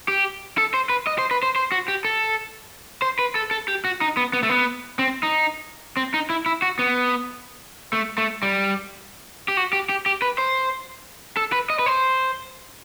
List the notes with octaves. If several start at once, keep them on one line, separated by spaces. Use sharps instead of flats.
G4
A4
C5
B4
D#5
C5
B4
C5
C5
F#4
G4
A4
C5
B4
A4
A4
G4
F#4
D#4
B3
B3
A3
B3
C4
D#4
C4
D#4
E4
E4
F#4
B3
A3
A3
G3
G4
F#4
G4
G4
G4
B4
C5
A4
B4
D#5
B4
C5